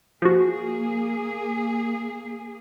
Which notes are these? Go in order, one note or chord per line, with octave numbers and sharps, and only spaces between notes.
F3 A#3 F#4 G#4